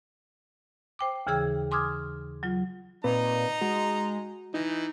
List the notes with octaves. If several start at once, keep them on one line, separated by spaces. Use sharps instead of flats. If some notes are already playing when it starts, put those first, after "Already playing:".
C5 G5 D6
D#2 C#3 E3 G#4 E6 G#6
G#5 C6 D6 D#6 F6 G#6
F#3 F4
A#2 C4 D#4 B4 A#5
G#3 F#4
E3 D#4